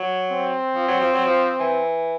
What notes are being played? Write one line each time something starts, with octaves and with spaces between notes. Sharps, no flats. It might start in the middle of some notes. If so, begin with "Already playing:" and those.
Already playing: F#3
C4
F3
F#3
F3
F#3
F3
E3